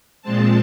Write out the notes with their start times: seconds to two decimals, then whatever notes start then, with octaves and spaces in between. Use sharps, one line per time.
0.22 A#2 F3 G#3 C4 A5